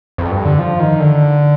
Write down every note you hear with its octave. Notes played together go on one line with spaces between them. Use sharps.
F2
G2
D3
F3
D#3
D3